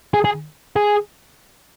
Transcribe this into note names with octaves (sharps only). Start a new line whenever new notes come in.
G#4
G#4
G#4